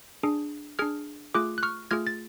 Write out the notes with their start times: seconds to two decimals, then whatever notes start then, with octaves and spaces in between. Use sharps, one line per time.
0.23 D4 G#4
0.79 D4 G#4 F6 G#6
1.34 A3 F4 G#4 D6 F#6
1.58 F#6
1.63 C#6 F6
1.91 A3 F4 G#4 F6 G#6
2.07 A6